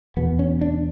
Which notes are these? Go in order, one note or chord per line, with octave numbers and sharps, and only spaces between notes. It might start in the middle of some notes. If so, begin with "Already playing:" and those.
E2 B2 B3
C#4
D4